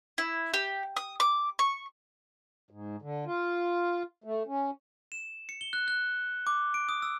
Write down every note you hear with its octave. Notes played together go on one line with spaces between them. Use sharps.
E4
G4
D#6
D6
C#6
G#2
D3
F4
A3
C#4
E7
C#7
G7
F#6
F#6
D6
D7
D#6
E6